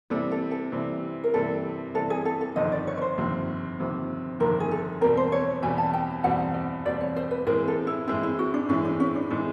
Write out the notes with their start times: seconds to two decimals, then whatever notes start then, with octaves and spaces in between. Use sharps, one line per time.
0.10 C3 E3 G3 A4
0.31 A4
0.51 A4
0.72 C3 E3 G3
1.24 A#4
1.34 C3 E3 G3 A4
1.94 C3 E3 G3 A4
2.10 G#4
2.25 A4
2.41 A4
2.56 G1 F2 C3 D#3 D#5
2.72 D5
2.87 C#5
2.97 C#5
3.01 C5
3.18 G1 F2 C3 D#3
3.79 G1 F2 C3 D#3
4.40 G1 F2 C3 D#3 A#4
4.60 G#4
4.71 A4
5.01 E2 B2 G3 C4 A#4
5.17 C5
5.32 C#5
5.63 E2 B2 G3 C4 G#5
5.78 A5
5.93 G5
6.24 E2 B2 G3 C4 F#5
6.54 D#5
6.85 E2 B2 G3 C4 D5
7.01 C#5
7.16 C5
7.31 B4
7.47 A2 E3 G#3 C4 A#4
7.68 A4
7.87 E4
8.08 A2 E3 G#3 C4 E4
8.23 E4
8.39 F#4
8.54 D4
8.69 A2 E3 G#3 C4 C#4
8.85 D4
9.00 C#4
9.16 D4
9.30 A2 E3 G#3 C4 D#4